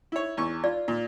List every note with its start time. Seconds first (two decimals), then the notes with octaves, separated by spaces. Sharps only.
0.12 E4 C#5
0.37 E2 C#6
0.64 F4 D5
0.88 A#2